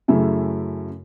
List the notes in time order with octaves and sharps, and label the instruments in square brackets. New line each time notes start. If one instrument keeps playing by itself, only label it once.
[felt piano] F#2 C#3 A3 E4